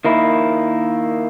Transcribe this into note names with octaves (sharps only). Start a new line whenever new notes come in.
D#3 A#3 E4